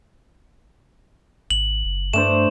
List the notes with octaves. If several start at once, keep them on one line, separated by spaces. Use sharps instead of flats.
G#1 F#7
F#1
G2 A3 D4 C5 E7